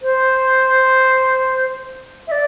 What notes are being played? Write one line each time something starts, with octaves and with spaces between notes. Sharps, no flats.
C5
E5
D5